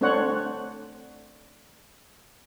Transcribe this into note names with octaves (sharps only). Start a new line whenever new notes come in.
A3 C4 D4 C5 C#5 F#5